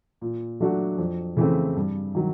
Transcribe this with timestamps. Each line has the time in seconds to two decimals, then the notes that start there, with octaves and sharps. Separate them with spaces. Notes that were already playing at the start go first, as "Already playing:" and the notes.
0.21 A#2
0.60 F#3 A3 D4 F#4
0.98 F2
1.37 C#3 E3 A3 C4
1.76 G2
2.15 D#3 F#3